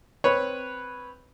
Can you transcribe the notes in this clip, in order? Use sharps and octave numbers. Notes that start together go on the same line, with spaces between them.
C4 B4 C#5